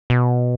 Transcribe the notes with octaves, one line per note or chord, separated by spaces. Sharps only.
B2